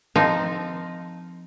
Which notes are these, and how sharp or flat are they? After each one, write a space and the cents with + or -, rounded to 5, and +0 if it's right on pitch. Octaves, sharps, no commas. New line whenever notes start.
F3 +0 C4 -20 D#4 +0